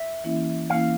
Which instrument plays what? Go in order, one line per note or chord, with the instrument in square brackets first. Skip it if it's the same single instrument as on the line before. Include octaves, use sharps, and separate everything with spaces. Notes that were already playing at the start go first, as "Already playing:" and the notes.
Already playing: [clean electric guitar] E5
[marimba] E3 A#3 C#4 E4
[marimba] E3 A#3 C#4 E4 [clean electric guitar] F5